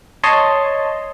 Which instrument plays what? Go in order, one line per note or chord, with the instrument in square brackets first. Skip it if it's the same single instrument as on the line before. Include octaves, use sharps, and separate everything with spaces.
[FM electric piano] C#5 D#5 A5 C6